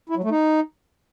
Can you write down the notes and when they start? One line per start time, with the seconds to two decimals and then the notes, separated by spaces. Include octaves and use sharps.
0.10 E4
0.17 F#3
0.24 A3
0.31 D#4